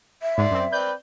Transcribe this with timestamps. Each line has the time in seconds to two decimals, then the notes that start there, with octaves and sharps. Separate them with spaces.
0.22 E5
0.38 G#2 D5 C6
0.51 F#2 C4
0.72 C4 B4 D5 G6